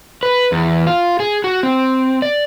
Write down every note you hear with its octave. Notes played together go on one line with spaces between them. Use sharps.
B4
E2
F4
G#4
F#4
C4
D5